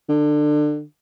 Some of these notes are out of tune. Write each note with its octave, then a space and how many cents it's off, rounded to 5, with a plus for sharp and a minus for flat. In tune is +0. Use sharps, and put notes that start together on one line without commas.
D3 +25